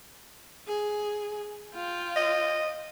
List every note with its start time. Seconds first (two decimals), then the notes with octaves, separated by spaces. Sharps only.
0.67 G#4
1.74 F4 G5
2.16 D#5